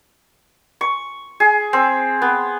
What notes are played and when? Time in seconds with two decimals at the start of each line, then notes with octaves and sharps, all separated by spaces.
0.81 C#6
1.40 G#4
1.73 C4
2.22 B3